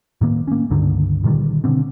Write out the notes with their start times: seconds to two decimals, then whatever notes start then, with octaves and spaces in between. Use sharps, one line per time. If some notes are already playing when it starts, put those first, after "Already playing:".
0.21 A2 D#3 A#3
0.48 A#3 C#4
0.70 C#2 G2 D3 D#3
1.24 A#2 D3 D#3 G3
1.64 B2 D3 C4